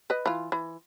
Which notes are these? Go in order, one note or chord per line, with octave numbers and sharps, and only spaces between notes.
B4 D#5
E3 F4
E3